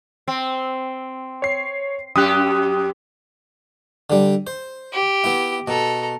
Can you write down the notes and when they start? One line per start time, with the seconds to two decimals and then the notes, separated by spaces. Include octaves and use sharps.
0.28 C4
1.42 C#5 C7
2.16 F#2 G4 D#6 F#6
4.10 D3 G3
4.47 C5
4.93 G4
5.24 B3 E4
5.68 B2 A4 A#5